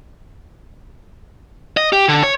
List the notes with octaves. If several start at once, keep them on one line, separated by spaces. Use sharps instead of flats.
D#5
G4
D3
C#5